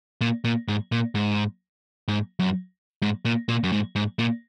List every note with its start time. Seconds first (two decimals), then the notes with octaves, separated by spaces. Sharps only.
0.21 A#2
0.45 A#2
0.68 G#2
0.92 A#2
1.15 G#2
2.08 G#2
2.39 F#2
3.02 G#2
3.25 A#2
3.49 A#2
3.64 F#2
3.72 G#2
3.96 G#2
4.19 A#2